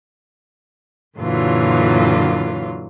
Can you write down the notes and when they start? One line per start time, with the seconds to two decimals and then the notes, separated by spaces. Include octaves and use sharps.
1.18 F#2 A#2 D3 E3 F#3 F4